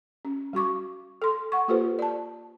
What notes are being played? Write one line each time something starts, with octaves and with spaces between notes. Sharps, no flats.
C#4
G3 F#4 C#6 D6
A4 C6
F#5 C#6
A#3 F4 G4 A4 B4 C5
D5 A5